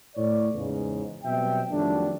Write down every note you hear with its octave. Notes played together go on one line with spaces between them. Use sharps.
A2 C#5 D5
E2 G#2 C#3
B2 F#3 G3 C4 E5 G5
F2 D#3 F#3 G3 A3 D4